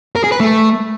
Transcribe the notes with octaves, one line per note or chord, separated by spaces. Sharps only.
A#4
G#4
B4
A3